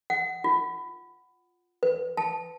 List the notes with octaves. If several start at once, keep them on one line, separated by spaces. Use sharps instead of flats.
F#5
F4
B4
A5